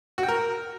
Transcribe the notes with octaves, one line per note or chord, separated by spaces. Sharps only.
F#4
G5
A#4